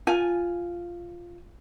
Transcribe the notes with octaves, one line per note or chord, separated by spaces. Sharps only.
F4 G#5